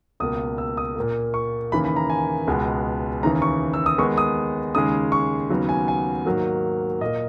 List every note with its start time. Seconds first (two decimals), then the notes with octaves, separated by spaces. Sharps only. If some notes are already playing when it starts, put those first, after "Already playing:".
0.20 C#2 B2 A#3 D#6
0.58 E6
0.77 D#6
0.96 A#2 A#3
1.34 C#6
1.72 D#2 C#3 E3 A#3 B5
1.85 B5
1.96 A#5
2.10 G#5
2.47 C#2 B2 G#3 B3
3.23 D#2 C#3 E3 A#5
3.42 C#6
3.74 E6
3.86 D#6
3.98 D#2 D#3 G#3 B3 C#6
4.18 D#6
4.75 D#2 C#3 G#3 D#6
5.12 C#6
5.50 D#2 C#3 F#3 B3
5.69 G#5
5.88 G#5
6.25 G#2 D#3 F#3 A#3
7.01 A#2 A#3 D#5